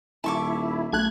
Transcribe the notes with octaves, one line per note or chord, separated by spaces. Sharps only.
D#1 E4 A5 C#6 D6
B1 A3 F#6 G#6